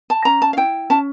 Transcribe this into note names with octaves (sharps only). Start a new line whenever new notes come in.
A5
C#4 A#5
A5
F5
E4 G5
C#4 A5